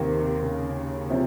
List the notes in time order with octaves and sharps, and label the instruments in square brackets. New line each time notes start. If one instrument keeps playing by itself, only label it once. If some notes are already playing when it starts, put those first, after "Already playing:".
Already playing: [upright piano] D#2 D#3 A#3 [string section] C3
[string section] C#3
[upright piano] C3 F3